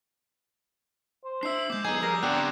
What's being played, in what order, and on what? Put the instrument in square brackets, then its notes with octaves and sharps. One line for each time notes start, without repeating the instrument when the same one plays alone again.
[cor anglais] C5
[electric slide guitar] D4 D#5 E5 [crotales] E6 C7
[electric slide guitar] G#3 B3 [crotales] D6 G6
[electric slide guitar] F#2 B3 [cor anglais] D#4 [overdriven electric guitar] G#4 [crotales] G#6
[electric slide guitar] F3 G3 [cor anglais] A#4 [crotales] D#6 A#6
[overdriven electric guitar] B3 G4 [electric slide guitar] C4 F#5 A#5 [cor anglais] D4 [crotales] F#6